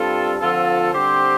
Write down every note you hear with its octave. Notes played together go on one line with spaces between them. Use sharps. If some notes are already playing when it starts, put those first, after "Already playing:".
Already playing: G2 G3 C4 F4 A4
D3 F3 C4 F4 A4
D3 G3 C4 G4 C5